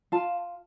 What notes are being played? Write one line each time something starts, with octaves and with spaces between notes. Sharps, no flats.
F4 F5 A5